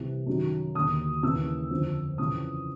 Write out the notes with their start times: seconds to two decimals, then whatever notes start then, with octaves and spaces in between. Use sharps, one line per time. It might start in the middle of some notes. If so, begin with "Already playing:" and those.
Already playing: C2 C3 E3
0.27 F#2 D#3
0.75 D#2 D3 D#6
1.23 D#2 C#3 E3 E6
1.71 F2 D3
2.18 F2 C#3 E3 D#6